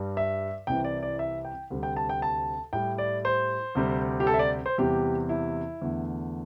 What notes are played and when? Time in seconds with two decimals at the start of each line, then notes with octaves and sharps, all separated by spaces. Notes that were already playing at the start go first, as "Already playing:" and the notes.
Already playing: G2 G3
0.17 E5
0.67 C2 C3 E3 G5
0.84 D5
1.03 D5
1.19 E5
1.45 G5
1.70 D2 C3 G3
1.83 G5
1.96 A5
2.09 G5
2.22 A5
2.73 A2 G3 G5
2.98 D5
3.25 C5
3.75 D2 C3 G3
4.20 G4
4.27 A4
4.34 E5
4.39 D5
4.66 C5
4.78 E2 C3 G3 G4
5.29 E4
5.82 E2 D3 A3